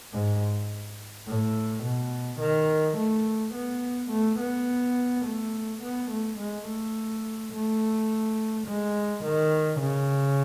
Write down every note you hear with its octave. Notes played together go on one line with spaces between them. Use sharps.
G#2
A2
B2
D#3
A3
B3
A3
B3
A3
B3
A3
G#3
A3
A3
G#3
D#3
C#3